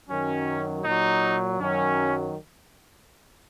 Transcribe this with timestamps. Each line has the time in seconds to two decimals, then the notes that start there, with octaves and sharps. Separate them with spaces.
0.09 F#2 D#3 F#3 C#4
0.84 A#2 F#3 D#4
1.60 F#2 D#3 F#3 C#4